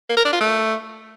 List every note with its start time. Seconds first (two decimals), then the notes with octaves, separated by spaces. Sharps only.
0.09 A#3
0.17 A#4
0.25 D4
0.33 F4
0.41 A3